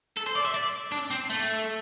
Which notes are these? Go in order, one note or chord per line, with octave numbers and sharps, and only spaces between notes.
A4
C5
D5
E5
D5
D4
C4
A3